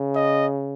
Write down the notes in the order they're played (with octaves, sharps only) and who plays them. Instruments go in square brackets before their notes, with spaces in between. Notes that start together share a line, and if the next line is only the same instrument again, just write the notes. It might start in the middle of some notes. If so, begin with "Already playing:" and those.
Already playing: [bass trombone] C#3
[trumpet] D#5